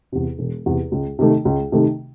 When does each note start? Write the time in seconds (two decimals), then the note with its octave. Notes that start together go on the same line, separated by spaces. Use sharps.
0.12 E2 C3
0.39 E1
0.66 E2 C3
0.92 C#2
1.19 C3 D#3 A3
1.45 C#2
1.72 C3 D#3 A3